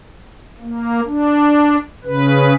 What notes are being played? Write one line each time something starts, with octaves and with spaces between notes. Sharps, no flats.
A#3
D4
C#3 B4